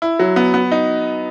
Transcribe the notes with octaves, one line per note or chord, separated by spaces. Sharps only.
E4
F#3
B3
B3
D#4